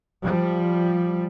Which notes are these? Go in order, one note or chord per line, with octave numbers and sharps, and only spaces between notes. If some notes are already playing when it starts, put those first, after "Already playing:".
F3 G3